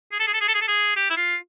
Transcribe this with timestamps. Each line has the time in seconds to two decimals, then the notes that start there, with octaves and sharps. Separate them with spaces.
0.12 G#4
0.19 A4
0.27 G#4
0.34 A4
0.41 G#4
0.48 A4
0.54 G#4
0.61 A4
0.68 G#4
0.96 G4
1.10 E4
1.17 F4